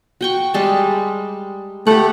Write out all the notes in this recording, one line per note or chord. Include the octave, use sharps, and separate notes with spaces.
F#4 G5 C#6
G3 G#3 A5
A3 G4 F#5